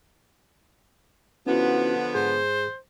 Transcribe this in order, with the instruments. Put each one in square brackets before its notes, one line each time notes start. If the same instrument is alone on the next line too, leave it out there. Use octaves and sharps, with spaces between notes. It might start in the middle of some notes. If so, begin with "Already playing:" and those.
[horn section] D3 F3 B3 [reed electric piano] C#4 E4 F#4
[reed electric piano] G#2 G#4 [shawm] C5